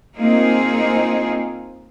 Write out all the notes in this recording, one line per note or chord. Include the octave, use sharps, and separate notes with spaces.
A#3 C4 D#4 F4 G#4